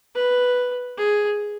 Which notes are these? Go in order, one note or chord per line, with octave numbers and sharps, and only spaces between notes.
B4
G#4